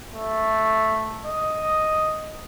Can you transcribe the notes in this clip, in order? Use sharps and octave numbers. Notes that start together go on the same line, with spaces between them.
A3
D#5